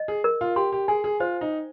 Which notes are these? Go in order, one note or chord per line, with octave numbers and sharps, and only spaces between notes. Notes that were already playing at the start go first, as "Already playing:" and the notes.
Already playing: D#5
G#4
A#4
F4
G4 C6
G4
G#4 G#5
G#4
F4 C5
D#4
G5